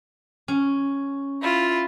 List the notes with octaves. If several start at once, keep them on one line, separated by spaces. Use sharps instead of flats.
C#4
E4 F4